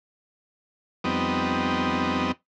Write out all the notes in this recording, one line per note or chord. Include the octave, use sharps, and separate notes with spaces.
F2 G3 B3 C4 D#4